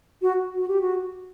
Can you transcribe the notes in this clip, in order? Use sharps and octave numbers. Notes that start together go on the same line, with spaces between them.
F#4
F#4
G4
F#4